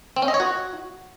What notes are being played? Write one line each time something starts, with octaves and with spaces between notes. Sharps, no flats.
C4
C#4
D#5
C#5
F#4